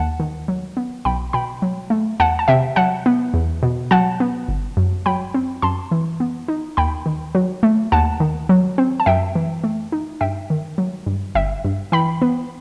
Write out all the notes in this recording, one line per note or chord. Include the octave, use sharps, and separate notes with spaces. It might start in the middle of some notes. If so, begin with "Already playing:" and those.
Already playing: D#2 F#5 A5
D#3
F#3
B3
B1 G5 B5
B2 G5 B5
F#3
A3
E2 F#5 A5
A5
C3 E5 G5
F#3 F#5 A5
B3
E2
B2
F#3 F#5 A5
B3
G1
F#2
F#3 G5 B5
C4
F#2 A5 C6
E3
B3
D#4
D#2 G5 B5
D#3
F#3
A3
D#2 F#5 A5
D#3
F#3
C4
A5
F#2 E5 G5
E3
A3
D#4
G2 E5 G5
D#3
F#3
G2
G1 E5 G5
G2
E3 G5 B5
B3